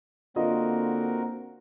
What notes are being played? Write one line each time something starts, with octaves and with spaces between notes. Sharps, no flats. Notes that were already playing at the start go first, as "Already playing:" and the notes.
D3 A#3 C4 F4 F#4 A#4 D#5